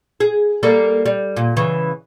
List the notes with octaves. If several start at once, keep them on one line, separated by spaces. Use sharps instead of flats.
G#4
G3 A#3 A4
G3
A#2
C#3 E3